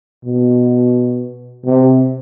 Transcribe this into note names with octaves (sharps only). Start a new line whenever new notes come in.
B2
C3